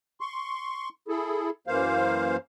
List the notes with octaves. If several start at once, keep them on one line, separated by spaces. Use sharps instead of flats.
C6 C#6
E4 G#4 A4
F#2 E3 A#3 C5 F5